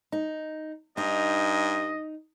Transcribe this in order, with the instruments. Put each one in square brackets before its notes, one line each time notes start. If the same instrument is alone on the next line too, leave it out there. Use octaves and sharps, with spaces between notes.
[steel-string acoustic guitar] D#4
[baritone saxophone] G2 [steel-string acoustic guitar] D#4 [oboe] D#5